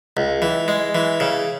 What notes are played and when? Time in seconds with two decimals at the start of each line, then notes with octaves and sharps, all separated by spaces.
0.17 C#2
0.42 E3
0.68 G#3
0.95 E3
1.20 C#3